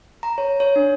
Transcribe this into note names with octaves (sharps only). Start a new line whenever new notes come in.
A#5
C#5
C#5
D4